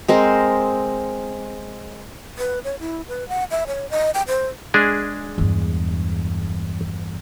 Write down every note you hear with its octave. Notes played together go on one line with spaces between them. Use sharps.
G#3 C4 A#4 C5
B4
C#5
E4
B4
F#5
E5
C#5
D#5
G5
C5
G#3 D4 G#4
E2 G2